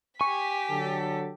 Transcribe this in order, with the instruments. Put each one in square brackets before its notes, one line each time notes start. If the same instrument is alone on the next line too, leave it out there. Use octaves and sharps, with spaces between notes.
[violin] G4 B6 [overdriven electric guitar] G#5 [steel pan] C#6
[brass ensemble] D3 F#3 A4